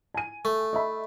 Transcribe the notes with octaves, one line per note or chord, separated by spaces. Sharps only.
G#5 D#7
A3
D#5 E5 B5